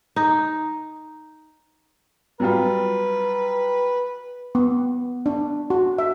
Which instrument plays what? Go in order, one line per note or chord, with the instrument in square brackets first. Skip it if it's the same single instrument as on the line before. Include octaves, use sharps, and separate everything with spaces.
[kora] D#4
[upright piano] F#3 G3 F4 [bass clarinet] B4
[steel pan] B3
D4
F#4
E5